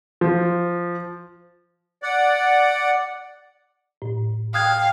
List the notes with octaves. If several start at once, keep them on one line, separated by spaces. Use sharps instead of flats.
F3
D5 F#5
A2
F5 G5 D#6 F#6 G#6